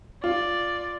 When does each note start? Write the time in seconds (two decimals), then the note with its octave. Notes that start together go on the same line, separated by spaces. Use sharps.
0.24 F4 D5